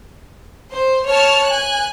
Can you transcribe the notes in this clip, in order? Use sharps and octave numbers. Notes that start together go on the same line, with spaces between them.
C5
C#5 A5 F6
G#5 F#6